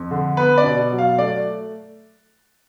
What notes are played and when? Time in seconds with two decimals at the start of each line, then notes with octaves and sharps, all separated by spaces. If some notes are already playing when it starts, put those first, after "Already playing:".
Already playing: F2
0.11 D3
0.37 B3 B4
0.58 D5
0.64 B2
0.91 F#3
0.98 F5
1.18 A3 D5